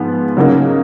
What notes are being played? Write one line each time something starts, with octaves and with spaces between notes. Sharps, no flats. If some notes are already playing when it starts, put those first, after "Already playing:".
Already playing: G#2 F3 B3
C#3 F#3 A#3 D#4